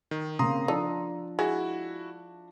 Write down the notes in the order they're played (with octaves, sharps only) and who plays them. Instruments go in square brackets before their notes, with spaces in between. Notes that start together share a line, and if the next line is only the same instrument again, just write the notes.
[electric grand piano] D#3
[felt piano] C#3 A#3 C4 [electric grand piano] A#5 C6 D#6
[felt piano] F3 D4 [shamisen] D#4 A4
[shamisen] G#3 [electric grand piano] E4 F#4